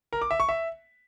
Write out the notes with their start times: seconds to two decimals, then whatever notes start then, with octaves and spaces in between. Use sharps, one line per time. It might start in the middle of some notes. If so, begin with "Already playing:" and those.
0.13 A#4
0.22 D6
0.31 E5
0.40 C#6
0.49 E5